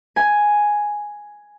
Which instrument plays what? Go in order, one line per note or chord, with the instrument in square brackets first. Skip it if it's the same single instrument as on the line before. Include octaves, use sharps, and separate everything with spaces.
[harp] G#5